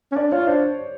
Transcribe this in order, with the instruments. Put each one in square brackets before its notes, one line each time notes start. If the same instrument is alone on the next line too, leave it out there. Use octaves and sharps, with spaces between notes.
[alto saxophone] C#4
[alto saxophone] D4 [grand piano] D5
[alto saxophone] F4 [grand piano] C#5
[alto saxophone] D4 [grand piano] C5